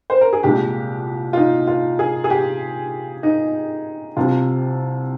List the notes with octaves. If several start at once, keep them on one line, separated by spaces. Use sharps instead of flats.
C5
A#4
G#4
C2 A#2 G#3 G4
F4
D#4
F4
G#4
G#4
G4
D#4
C2 C3 G3 F4